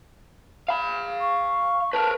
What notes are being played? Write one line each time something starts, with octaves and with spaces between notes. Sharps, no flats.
F5 B5
C#6
A#4 B4 A5